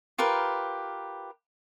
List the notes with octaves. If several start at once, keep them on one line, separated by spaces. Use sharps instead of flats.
F4 G4 A#4 B4